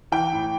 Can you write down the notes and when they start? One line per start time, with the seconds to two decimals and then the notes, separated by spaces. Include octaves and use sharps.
0.12 E3 G5
0.33 A2